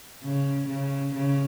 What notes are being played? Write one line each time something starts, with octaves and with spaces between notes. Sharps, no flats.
C#3
C#3
C#3